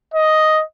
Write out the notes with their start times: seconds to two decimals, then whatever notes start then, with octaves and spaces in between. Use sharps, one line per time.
0.14 D#5